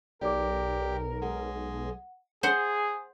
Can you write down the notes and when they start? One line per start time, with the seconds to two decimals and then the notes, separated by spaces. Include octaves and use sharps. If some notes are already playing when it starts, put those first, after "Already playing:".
0.21 B1 G4 A#4 D5 D6
1.22 G#3 F#5
2.43 G#4 C5 F#5